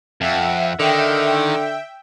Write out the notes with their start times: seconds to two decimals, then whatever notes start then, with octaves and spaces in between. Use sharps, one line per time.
0.21 F2 E5 F#5
0.79 D3 D#3 E5 G5